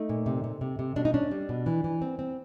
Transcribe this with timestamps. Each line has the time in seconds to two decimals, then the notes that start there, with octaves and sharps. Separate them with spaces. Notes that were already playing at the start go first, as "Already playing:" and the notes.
Already playing: A3 D#4
0.09 A#2
0.26 C3
0.44 C3
0.61 C3
0.79 C3
0.96 B2 D4
1.05 D#4
1.14 C#4 D4
1.31 G3
1.49 B2
1.66 E3
1.84 E3
2.02 C4
2.19 C4